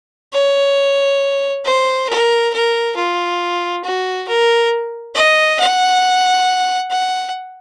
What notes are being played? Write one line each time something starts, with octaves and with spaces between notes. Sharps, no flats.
C#5
C5
A#4
A#4
F4
F#4
A#4
D#5
F#5
F#5